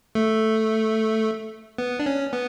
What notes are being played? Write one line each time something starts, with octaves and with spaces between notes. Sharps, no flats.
A3
B3
D4
C#4
B3